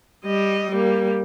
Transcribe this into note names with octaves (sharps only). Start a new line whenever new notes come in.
G3 D#5
G3 A#3